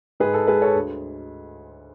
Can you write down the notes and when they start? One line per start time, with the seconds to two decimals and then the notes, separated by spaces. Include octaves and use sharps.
0.20 G#2 G#4 B4
0.34 A4
0.47 G#3 G#4 B4
0.62 A4 C#5
0.75 D2